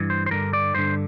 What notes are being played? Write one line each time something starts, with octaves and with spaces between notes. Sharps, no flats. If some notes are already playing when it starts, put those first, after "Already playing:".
Already playing: G2 E3
C5
C5
G2 D3 A#4
D5
G2 D3 C5